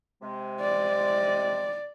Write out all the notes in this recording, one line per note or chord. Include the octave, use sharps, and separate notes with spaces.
C3 G#3
D5